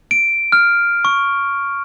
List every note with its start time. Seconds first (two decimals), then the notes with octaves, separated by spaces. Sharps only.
0.11 D7
0.52 F6
1.05 C#6